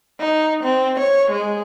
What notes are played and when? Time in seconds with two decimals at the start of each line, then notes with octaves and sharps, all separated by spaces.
0.20 D#4
0.64 C4
0.99 C#5
1.31 G#3